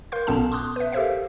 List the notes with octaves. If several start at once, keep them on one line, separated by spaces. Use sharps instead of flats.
A#4 F5 C6 G6
A#1 A#2 B3 C#4 A4 A5
C6 D6 D#6 F#6
B4 E5
G4 A4 A#4 C5 E5 F5